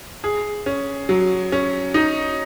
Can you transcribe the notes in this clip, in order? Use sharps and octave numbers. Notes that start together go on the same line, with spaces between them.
G#4
C#4
F#3
C#4
D#4